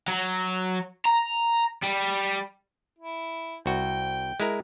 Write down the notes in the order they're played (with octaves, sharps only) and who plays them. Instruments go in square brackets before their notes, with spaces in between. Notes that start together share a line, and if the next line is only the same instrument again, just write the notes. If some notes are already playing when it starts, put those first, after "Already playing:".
[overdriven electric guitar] F#3
A#5
G3
[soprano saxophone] E4
[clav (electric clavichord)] C2 F#4 [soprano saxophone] G5
[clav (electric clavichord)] G#3 E4 A#4